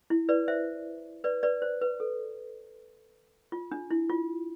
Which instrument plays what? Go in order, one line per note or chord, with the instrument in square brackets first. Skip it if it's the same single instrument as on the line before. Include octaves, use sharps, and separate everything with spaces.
[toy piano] E4
B4 D5
C5 E5
B4 D5
B4 D5
C5
B4
A4
F4
D4
E4
F4